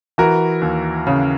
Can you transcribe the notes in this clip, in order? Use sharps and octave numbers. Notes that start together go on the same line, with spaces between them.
E3 F#4 A#4
D#2
C#3